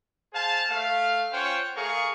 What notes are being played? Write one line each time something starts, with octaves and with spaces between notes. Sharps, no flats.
G#4 C5 F5 A5
A3 F5
C#4 F4 C5 C#5 F#5 G5
A3 G#4 A#4 F5 C#6